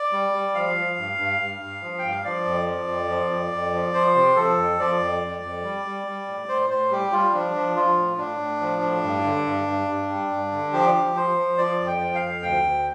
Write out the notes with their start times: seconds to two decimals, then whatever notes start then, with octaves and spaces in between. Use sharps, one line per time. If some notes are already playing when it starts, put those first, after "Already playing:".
Already playing: D5
0.12 G3
0.33 G3
0.55 F3 F5
0.76 F3
0.97 G2
1.18 G2
1.40 G2
1.61 G2
1.82 F3
1.99 G2 G5
2.11 F5
2.24 F3 D5
2.45 F2
2.66 F3
2.88 F2
3.09 F3
3.31 F2
3.51 F2
3.73 F3
3.93 F3 C5
4.16 C3
4.36 F3 A4
4.57 F2
4.79 F3 D5
5.00 F2
5.22 F2
5.43 F2
5.64 G3
5.85 G3
6.07 G3
6.28 A2
6.48 A2 C5
6.70 A2 C5
6.91 G3 G4
7.12 G3 F4
7.33 F3 D4
7.55 F3
7.76 F3 F4
7.98 A2
8.18 A2 D4
8.40 A2
8.61 F3
8.82 A2
9.04 G2
9.24 D3
9.46 G2
9.67 G2
9.88 G2
10.10 G3
10.31 G2
10.52 D3
10.72 F3 G4
10.94 F3
11.15 F3 C5
11.37 F3
11.58 F3 D5
11.80 F2
11.87 G5
12.00 F3
12.15 F5
12.22 F2
12.42 D2 G5
12.63 D2